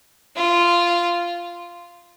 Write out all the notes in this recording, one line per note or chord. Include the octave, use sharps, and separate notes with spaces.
F4